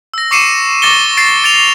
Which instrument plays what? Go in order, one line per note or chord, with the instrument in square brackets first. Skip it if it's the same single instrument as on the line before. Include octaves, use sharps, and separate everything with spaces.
[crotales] E6 A#6
C#6 D6 C7 C#7 D#7 E7
C#6 D6 A6 A#6 C#7 G7
A6 C7 D7
A6 D7 F7